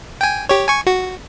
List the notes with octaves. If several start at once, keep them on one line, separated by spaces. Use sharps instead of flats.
G5 G#5
G4 C#5
G#5 C#6
F#4